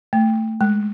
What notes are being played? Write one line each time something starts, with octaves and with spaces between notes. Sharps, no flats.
A3
G#3